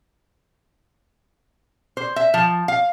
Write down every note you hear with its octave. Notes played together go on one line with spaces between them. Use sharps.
C5
E5
F3
F5